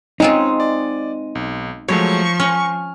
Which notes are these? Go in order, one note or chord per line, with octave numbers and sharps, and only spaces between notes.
G#3 C4 C#4 D#4 F4
D5
B1
F3 F#3 G#3 A3 C#5 C#6
C#4 F6